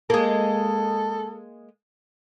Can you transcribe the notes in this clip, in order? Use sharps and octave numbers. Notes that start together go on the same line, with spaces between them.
G#3 A#3 A4